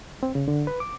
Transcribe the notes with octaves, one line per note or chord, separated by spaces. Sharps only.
C4
C#3
D3
B4
D6